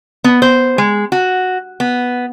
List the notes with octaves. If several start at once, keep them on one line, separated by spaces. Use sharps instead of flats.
B3
C5
G#3
F#4
B3